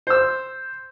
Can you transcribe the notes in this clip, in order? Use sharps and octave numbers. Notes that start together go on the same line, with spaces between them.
C5 E6